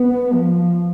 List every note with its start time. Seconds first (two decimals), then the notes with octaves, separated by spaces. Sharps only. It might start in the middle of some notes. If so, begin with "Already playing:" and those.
Already playing: B3
0.33 F3